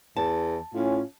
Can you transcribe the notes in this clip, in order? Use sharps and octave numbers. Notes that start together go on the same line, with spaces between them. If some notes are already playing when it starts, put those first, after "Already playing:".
E2 A5
A2 C#4 F4